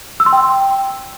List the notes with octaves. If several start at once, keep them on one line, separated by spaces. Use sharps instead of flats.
E6
C6
G5